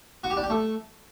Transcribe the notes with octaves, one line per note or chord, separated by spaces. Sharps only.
F#4
G4
D4
G4
A3